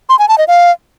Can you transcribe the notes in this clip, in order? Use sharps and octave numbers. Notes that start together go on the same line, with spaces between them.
C6
G#5
A5
D#5
F5